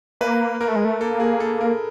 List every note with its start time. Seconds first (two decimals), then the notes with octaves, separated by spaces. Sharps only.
0.21 A#3 B4
0.60 A#3 A#4
0.68 A3
0.76 G#3
0.85 A3
1.01 A#3 A4
1.20 G#4
1.40 A4
1.61 A#4